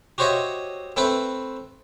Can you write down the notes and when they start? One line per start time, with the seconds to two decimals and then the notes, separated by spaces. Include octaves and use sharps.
0.18 F#4 G4 C5 C#5 D#5 E5
0.96 A3 C4 A4 B4 C5 E5